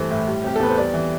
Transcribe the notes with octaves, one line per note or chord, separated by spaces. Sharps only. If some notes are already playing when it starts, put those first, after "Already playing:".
Already playing: G2 E3 A3 C5
A2
G3
C3 G4
A4
E2 B4
C5
G3 D5
E3